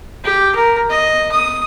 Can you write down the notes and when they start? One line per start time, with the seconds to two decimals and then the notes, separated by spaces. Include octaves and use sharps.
0.24 G4
0.56 A#4
0.90 D#5
1.32 D#6